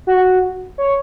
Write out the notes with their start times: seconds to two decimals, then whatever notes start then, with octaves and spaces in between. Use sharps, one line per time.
0.07 F#4
0.78 C#5